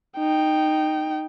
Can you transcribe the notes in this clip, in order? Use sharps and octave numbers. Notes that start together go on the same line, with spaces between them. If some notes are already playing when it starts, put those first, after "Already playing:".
D#4 G5